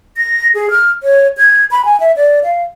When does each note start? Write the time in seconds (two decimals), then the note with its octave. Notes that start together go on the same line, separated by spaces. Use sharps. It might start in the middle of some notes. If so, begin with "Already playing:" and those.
0.17 A#6
0.54 G#4
0.71 F6
1.03 C#5
1.38 G#6
1.71 B5
1.85 G#5
2.00 E5
2.16 D5
2.43 F5